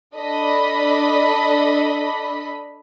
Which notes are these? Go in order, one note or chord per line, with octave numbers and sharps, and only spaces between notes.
D4 A4 D#5 B5